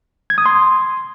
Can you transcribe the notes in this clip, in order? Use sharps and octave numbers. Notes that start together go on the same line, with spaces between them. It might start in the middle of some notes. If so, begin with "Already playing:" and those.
G#6
D#6
C6